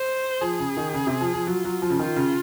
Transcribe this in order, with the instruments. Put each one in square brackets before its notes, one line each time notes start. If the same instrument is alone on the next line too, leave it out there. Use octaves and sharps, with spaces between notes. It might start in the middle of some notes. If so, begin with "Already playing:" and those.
Already playing: [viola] C5
[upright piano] F3 [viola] G#4
[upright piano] C#3
D#3
C#3
C3
F3
F3
[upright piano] F#3 [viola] F4
[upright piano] F#3
F3
C#3
[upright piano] D#3 [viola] F4
[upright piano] C#3